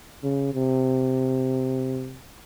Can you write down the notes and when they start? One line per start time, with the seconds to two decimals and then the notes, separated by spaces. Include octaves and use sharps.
0.23 C#3
0.54 C3